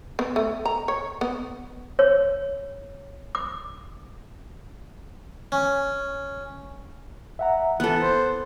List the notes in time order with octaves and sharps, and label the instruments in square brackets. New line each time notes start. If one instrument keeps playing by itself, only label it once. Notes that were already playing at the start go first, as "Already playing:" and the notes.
[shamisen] B3
A3
A#5
C#5
B3
[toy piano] C#5
D6
[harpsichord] C#4
[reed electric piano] E5 F#5 A#5
[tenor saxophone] E3 [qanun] B3 A4 [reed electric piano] F#6
[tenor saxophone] C5